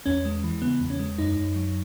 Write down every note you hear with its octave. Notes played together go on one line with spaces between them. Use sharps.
E2 C#4
G#3
E3
C#3 B3
E2
C#4
G#3
F#2 D#4
F#2
F#3